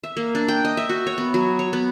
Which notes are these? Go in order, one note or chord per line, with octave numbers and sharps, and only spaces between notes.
E5
A#3
D4
G5
D#5
E5
F#4
C#5
B3
F#3
C#5
B3